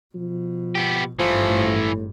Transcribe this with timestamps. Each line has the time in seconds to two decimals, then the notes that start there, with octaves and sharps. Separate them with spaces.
0.15 B2 F3
0.75 B3 G4
1.19 G#1 G2 E3 F3 A3
1.49 A2